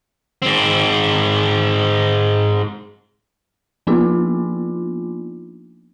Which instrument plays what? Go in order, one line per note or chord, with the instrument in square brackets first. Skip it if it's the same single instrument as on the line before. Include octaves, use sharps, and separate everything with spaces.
[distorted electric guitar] G#2 C4
[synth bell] F3 A#3 B3 D4 D#4 F4